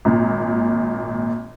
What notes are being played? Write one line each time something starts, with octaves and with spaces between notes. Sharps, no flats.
G#1 A#2